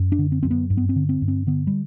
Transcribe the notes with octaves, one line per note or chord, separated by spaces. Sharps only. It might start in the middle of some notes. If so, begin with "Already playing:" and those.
Already playing: F#2
D4
D3
C4
F#2 C4
B3
G2
B3
C4
D3
C4
G2
C4
D3 B3
G3